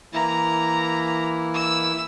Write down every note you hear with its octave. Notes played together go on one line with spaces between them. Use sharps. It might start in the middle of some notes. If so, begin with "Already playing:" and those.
E3 A#3 E4 A#5
E6